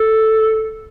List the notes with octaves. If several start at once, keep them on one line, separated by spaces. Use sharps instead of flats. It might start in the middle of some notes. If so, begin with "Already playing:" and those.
Already playing: A4